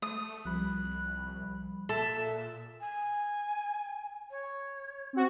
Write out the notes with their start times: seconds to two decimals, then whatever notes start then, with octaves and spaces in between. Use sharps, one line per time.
0.02 A3 D#6
0.45 C2 F3 G3 B5 F#6
1.89 A#2 A4 E5
2.81 G#5
4.31 C#5
5.13 C4 F#4